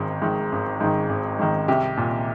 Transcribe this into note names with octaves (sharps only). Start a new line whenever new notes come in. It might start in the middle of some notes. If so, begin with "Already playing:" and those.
Already playing: G#1 G#2 D#3
G#2 D#3
G#1
G#2 D#3
G#1
G#2 D#3
C2 G4
A#2